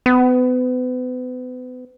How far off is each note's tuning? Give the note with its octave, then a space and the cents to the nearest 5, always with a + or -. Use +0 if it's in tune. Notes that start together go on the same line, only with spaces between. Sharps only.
B3 +35